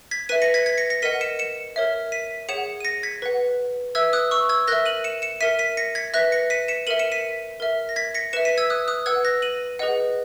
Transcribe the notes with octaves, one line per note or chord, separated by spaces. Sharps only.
G#6 B6
B4 E5 B6 D#7
A#6 C#7
G#6 B6
G#6 B6
A#6 C#7
A#6 C#7
A#4 D#5 F#5 B6 D#7
C#7 E7
C#7 E7
A#4 C#5 E5
B6 D#7
G#4 C#5 F#5 C#7 E7
D#7
A#6 C#7
G#6 B6
B4 F#5
B4 E5 E6 G#6
D#6 F#6
C#6 E6
E6 G#6
A#4 E5 F#6 A#6
D#7 F#7
C#7 E7
C#7 E7
A#4 E5 B6 D#7
B6 D#7
A#6 C#7
G#6 B6
B4 E5 F#6 A#6
A#6 C#7
B6 D#7
C#7 E7
A#4 E5 D#7 F#7
C#7 E7
B6 D#7
A#4 E5
A#6
G#6 B6
A#6 C#7
B4 E5 C#7 E7
B6 D#7
E6 G#6
D#6 F#6
D#6 F#6
B4 F#5 E6 G#6
F#6 A#6
D#7 F#7
G#4 B4 D#5 F#5